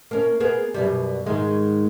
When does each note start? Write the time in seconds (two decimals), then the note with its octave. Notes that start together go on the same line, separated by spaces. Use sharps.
0.11 A#3 C#4
0.40 A#3 B3 G#4
0.74 F#2 B2 G3
1.26 G#2 D#3 G#3